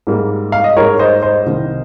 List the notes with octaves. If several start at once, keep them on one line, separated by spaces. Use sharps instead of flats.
G#2 G3 A#3
F5
D#5
G#2 G3 A#3 A#4 C#5
C5 D#5
C5 D#5
C2 C3 D#3 G3 A#3